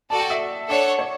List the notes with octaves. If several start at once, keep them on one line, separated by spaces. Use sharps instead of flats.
F#4 A4 D5 A5
G5
E5
D4 A4 C#5 D5 F#5
C#5